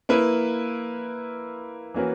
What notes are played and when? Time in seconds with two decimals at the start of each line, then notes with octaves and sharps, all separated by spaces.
0.09 A#3 E4 B4
1.94 E3 A#3 C#4 F#4 B4